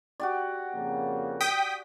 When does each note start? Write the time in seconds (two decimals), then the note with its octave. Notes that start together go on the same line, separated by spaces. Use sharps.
0.20 F#4 G4 D5
0.74 F2 C#3 A#3
1.41 G5 D#6 B6